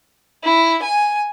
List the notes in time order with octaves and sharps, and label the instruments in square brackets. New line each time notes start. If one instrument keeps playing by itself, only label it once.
[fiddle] E4
G#5